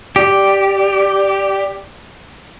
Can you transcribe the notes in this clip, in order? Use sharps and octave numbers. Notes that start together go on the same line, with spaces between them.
G4 D5